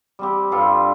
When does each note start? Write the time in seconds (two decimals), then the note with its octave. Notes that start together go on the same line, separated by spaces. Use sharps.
0.19 G3 C4 G4
0.51 G2 G3 F4 A4